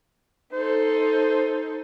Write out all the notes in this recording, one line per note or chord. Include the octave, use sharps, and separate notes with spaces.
D#4 A4 C5